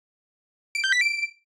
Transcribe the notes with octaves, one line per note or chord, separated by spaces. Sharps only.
D7
G6
B6
D7